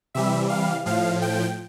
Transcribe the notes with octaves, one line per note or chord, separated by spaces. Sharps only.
C3 E3 G3 E5
F5
A2 F3 F5
G5